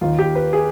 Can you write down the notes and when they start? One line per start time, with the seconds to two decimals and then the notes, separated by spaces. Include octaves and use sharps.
0.01 D#2 D#3 F4
0.19 G4
0.35 B4
0.53 G#4